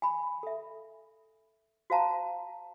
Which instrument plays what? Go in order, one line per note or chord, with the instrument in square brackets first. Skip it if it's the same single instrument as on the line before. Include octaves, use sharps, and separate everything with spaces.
[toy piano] G#5 B5
A4 E5
F#4 C5 F5 A5 A#5